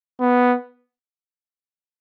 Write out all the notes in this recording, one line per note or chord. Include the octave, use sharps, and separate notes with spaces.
B3